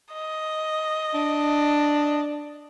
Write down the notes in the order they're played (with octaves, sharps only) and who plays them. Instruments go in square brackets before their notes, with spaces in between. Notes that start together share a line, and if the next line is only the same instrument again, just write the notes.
[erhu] D#5
[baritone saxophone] D4